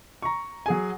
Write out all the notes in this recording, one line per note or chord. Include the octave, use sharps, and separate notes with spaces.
A#5 C#6
F#3 G#4 G#5